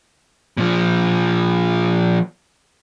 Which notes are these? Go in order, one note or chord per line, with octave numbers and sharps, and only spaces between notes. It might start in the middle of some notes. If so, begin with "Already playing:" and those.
A#2 F3